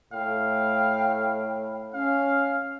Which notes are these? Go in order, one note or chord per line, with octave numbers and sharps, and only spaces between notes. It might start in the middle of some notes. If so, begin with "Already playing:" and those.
A2 F5 G5
C#4 F5